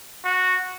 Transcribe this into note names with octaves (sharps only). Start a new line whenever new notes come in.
F#4